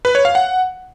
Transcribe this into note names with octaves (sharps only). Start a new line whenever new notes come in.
B4
C#5
F5
F#5